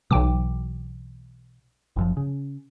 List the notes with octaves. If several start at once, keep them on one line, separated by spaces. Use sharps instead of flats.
B1 B2 E3 F#3 G5 D6
F#1 F#2 F3
C#3